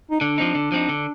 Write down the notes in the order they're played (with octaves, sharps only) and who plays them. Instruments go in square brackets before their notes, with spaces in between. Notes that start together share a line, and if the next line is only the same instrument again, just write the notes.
[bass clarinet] D#4
[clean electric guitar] D3 [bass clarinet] D4
[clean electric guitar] F3 C4 D#4
D3
F3 C4 D#4
D3